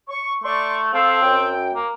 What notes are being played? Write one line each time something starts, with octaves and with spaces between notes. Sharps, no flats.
C#6
A3 D5 C6 C#6
C4 A4 F5
F#2 G5
A#3